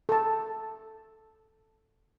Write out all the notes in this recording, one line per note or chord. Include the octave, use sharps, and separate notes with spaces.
A4 A5